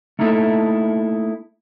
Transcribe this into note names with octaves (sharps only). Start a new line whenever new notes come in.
A3 A#3 D#4 E4 F#4 A4